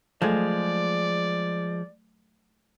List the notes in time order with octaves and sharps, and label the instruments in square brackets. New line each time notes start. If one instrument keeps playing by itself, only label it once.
[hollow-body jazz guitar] F3 G#3 G#4 [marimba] F#3 A3 A4 [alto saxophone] D5